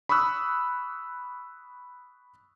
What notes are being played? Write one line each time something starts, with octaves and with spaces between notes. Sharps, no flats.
B5 C#6 D#6 E6 F#6